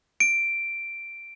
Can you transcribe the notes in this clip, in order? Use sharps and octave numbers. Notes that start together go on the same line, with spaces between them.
D7